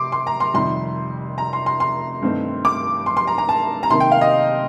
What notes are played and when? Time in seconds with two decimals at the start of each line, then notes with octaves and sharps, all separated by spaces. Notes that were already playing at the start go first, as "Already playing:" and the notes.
Already playing: C3 C6 D6
0.12 C6
0.27 A#5
0.40 C6
0.54 F2 C3 D#3 G3 C6
1.38 A#5
1.53 C6
1.66 C6
1.80 C6
2.22 G2 D#3 A3 C4 D#4
2.65 D6
3.06 C6
3.17 C6
3.27 A#5
3.38 A#5
3.49 A5
3.83 A#5
3.90 C3 D#3 A#3 C6
4.00 G5
4.12 F5
4.21 D#5